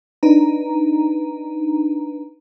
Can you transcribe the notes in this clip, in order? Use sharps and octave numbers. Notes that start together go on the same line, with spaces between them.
D4 D#4 B4 A#5